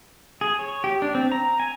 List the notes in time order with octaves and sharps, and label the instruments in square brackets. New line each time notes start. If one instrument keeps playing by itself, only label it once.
[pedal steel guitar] G#4
C#5
G4
D4
C4
A#5
G#5